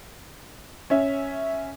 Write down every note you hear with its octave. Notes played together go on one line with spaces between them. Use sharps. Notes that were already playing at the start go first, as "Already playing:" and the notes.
C#4 E5